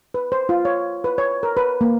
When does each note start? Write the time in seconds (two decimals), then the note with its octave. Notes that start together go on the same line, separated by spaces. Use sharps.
0.14 B4
0.32 C5
0.49 F4
0.65 C#5
1.04 B4
1.18 C#5
1.43 A#4
1.57 B4
1.81 A#3